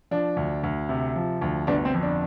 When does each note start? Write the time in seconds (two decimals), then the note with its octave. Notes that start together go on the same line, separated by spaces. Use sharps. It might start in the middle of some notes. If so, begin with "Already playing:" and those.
0.11 F3 D4
0.37 D2
0.63 D2
0.89 C3
1.16 F3
1.41 D2
1.67 G1 D4
1.85 C4
1.94 F2
2.02 D4